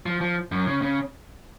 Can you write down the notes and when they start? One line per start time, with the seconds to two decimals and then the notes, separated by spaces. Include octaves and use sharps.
0.06 F3
0.21 F3
0.52 F#2
0.67 C#3
0.82 C#3